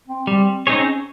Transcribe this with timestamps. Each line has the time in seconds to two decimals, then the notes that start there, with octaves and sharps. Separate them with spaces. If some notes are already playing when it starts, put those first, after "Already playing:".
0.08 C4
0.27 G3 C4
0.67 C4 C#4 D#4 G#4 C#5